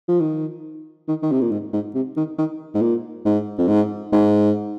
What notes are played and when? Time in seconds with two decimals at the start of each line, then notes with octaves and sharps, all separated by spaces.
0.08 F3
0.20 D#3
1.08 D#3
1.22 D#3
1.32 C3
1.41 A#2
1.51 G#2
1.73 G#2
1.95 C3
2.17 D#3
2.38 D#3
2.75 G#2
2.81 A#2
3.25 G#2
3.58 F2
3.68 G#2
4.12 G#2